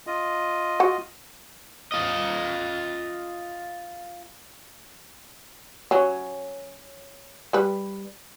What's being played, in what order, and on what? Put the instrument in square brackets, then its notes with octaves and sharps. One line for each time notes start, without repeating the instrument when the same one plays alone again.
[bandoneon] F4 D#5
[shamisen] F#4 F#5
[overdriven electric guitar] F4 D#5
[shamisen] F#3 C#4
G3 B4